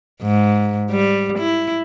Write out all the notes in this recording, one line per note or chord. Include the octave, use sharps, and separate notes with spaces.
G#2
G3
E4